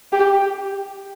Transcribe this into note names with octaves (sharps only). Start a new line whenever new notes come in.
G4